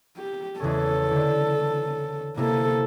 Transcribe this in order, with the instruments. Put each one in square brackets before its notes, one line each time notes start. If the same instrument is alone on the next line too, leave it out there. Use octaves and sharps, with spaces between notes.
[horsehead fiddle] G4
[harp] E2 C#3 C#4 [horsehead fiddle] A4
[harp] D3
[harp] C3 E4 [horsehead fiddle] A#3 A4